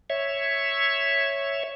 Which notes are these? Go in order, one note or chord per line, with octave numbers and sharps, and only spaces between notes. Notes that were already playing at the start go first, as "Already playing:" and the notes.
C#5 E5